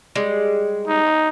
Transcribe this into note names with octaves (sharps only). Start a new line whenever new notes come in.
G3 G#3
D#4